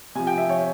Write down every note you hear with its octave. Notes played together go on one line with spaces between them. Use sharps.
C3 F3 G#5
G5
E5
C#5